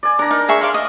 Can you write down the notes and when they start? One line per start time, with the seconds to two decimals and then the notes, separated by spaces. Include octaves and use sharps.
0.03 D5 G#5
0.19 D4 A#4 A#5
0.31 D#4 A#4
0.49 G#4 E5 C#6
0.61 D5 F5 C6
0.74 D#5